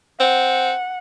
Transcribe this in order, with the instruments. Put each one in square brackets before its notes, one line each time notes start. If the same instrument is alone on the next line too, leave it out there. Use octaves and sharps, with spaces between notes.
[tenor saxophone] C4 [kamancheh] F#5